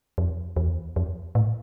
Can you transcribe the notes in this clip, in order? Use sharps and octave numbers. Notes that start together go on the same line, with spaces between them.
F2
E2
F2
A2